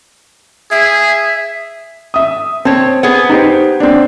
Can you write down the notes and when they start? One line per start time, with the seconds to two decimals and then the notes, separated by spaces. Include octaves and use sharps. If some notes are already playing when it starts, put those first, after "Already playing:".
0.71 G#4 E5
2.14 E5 D#6
2.65 C4 C#5 A5
3.03 B3 G#4
3.29 D#4 G4 C5
3.80 C4 D4